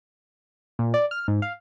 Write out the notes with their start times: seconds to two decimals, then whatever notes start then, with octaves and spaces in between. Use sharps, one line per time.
0.79 A#2
0.94 D5
1.11 F6
1.28 G#2
1.42 F5